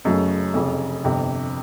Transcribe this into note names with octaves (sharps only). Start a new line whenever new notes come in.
F#1 F#2 C#3 F#3 A3
F1 F2 C#3
G1 F2 C3